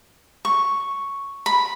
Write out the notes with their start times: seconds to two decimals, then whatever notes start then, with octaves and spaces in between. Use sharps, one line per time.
0.45 C#6
1.46 B5